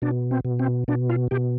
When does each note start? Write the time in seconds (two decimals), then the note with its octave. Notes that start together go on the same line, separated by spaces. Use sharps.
0.02 B2 D4
0.31 C4
0.45 B2
0.59 C4
0.88 B2 D4
1.10 F4
1.31 B2 G4